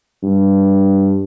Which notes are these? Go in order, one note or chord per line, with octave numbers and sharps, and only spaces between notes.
G2